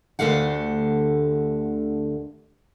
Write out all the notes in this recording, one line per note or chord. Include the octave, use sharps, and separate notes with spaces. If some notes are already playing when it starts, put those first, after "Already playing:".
D2 D3 A3 G4 F5 F#5